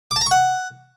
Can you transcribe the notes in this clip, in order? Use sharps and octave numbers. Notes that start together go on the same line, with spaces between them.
D6
A5
A#5
C#6
F#5